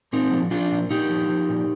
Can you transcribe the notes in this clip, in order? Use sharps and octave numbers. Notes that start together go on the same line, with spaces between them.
A#2 C4 D#4
F3
F3 D4 F4
A#2
A#2 D#4 G4
F3
F3
A#2